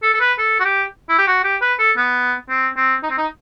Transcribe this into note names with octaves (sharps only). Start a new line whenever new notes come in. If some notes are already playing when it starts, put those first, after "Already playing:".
A4
A4
B4
A4
F#4
G4
E4
G4
F#4
G4
B4
A4
B3
C4
C4
D#4
C4
D#4